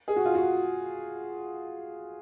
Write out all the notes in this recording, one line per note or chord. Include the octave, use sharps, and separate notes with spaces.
G#4
F#4
F4
F#4